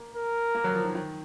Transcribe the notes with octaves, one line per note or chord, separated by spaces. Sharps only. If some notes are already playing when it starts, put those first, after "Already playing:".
Already playing: A#3
A#4
A#3
F#3
F3
D#3
D#3